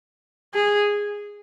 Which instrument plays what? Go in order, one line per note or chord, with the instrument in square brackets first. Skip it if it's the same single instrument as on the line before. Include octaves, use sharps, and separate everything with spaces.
[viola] G#4